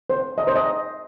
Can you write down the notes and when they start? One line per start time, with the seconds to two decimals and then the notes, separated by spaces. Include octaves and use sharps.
0.10 C5
0.38 D#5
0.47 C5
0.56 D#5